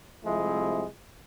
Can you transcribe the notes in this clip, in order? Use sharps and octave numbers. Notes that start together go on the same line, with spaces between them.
C2 C3 F3 G#3 A3 E4